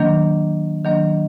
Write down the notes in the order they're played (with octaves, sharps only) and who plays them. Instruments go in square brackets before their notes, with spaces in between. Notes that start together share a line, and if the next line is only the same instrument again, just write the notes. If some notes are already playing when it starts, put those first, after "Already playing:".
Already playing: [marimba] D#3 F#3 A#3 D4
D#3 F#3 A#3 D4